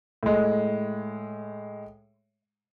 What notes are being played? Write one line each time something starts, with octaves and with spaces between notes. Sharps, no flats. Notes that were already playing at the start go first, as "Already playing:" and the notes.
A2 G#3